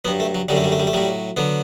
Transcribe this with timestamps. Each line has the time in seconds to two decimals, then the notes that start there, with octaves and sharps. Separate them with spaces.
0.05 F#3 B3
0.08 G2
0.20 A3
0.35 F#3
0.49 F#2 D3 F#3 G3
0.57 A3
0.64 G3
0.72 A3
0.79 G3
0.87 A3
0.93 A2 F#3 G3
1.37 D3 F#3 B3